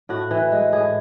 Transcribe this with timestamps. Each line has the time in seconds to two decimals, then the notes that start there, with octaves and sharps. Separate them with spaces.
0.09 A2 F#4
0.31 E3
0.52 G#3
0.73 A2 G#4